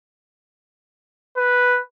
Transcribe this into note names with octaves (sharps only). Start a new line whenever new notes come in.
B4